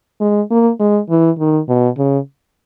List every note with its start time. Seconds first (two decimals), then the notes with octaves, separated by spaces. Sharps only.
0.21 G#3
0.51 A#3
0.80 G#3
1.09 E3
1.39 D#3
1.68 B2
1.98 C#3